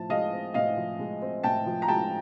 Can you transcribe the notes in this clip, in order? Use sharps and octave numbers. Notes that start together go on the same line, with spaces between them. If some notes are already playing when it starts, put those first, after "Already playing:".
Already playing: A2 F3 A5
G#3 D#5 F5
C4
A2 D#5 F5
F3
G#3
C4
A2 G5 A5
F3
A#5
G#3 G5 A5